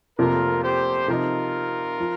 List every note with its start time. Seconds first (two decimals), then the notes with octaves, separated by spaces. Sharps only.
0.18 F1 F2 C3 F3 A#3 F4 A#4
0.64 G4 C5
1.08 C3 F3 D#4 F4 A#4
2.00 F3